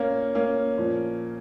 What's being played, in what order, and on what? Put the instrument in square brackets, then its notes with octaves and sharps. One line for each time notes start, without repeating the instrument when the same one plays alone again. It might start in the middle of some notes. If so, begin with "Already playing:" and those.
Already playing: [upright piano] A#2 A#3 C#4
A#3 C#4
A#2 F3